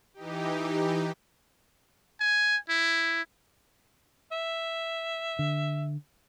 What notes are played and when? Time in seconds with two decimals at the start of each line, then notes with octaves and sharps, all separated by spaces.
0.14 E3 D#4 G4
2.21 G#5
2.69 E4
4.32 E5
5.39 D3